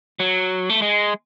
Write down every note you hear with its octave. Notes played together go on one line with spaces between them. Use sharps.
F#3
A3
G#3